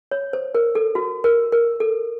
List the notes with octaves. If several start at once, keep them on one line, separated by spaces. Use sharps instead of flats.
C#5
C5
A#4
A4
F#4
A#4
A#4
A4